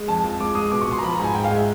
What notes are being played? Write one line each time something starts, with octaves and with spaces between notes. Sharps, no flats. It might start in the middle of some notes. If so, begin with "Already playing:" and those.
Already playing: G#3
F2 A5
F3
G#3 D6
G#3 D#6
B2 D6
C#6
B2 C6
A#5
F3 B5
A#5
G#2 G#5
G#2 G5
F5
G#3
E5